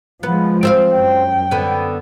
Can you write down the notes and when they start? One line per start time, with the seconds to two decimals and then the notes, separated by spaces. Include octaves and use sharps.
0.23 F3 G#3 B3
0.63 C4 E5 F5
0.94 F#2 G5
1.51 D3 B3